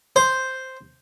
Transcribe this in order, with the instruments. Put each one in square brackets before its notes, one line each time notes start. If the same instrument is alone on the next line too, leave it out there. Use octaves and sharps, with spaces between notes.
[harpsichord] C5